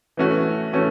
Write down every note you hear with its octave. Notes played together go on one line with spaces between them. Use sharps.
E3 A3 C#4 F#4
E3 A3 C#4 F#4